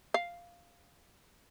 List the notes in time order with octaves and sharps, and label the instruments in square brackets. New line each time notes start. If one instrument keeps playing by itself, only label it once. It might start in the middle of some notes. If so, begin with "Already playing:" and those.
[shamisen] F5